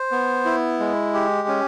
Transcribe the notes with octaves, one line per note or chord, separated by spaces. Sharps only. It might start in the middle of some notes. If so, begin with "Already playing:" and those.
Already playing: C5
B3
E4
G#3
G4
C#4